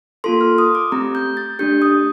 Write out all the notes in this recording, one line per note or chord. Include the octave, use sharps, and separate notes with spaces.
A#3 F4 A4 C6
F6
D#6
D6
A3 C4 G4 A#5
G6
A6
A3 D4 G4 G6
D#6